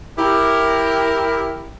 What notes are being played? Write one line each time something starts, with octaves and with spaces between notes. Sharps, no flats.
E4 G4 A#4